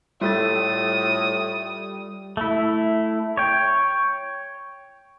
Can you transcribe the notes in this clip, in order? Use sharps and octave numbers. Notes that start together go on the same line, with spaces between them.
A2 G3 F4 A4 D#6 A6
A3 E4
C#5 G5